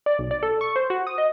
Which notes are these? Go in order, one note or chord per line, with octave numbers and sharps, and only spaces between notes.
D5
B1
D5
A4
C#6
C5
F#4
D#6
D#5